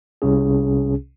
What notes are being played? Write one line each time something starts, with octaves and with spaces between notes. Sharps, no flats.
C2 C3 C#4 G#4